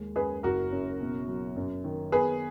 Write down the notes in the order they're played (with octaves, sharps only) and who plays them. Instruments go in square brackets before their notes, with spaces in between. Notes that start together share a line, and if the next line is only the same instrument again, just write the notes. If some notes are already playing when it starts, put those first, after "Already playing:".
Already playing: [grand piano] D#2 G#3
[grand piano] F#2 [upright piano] G#4 B4
[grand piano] F#1 [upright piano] F#4 A#4
[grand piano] F#2
B2
F#3
F#2
D#3
[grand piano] B3 [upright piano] G#4 B4